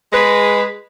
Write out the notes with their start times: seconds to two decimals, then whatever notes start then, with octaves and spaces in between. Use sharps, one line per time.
0.13 G#3 B4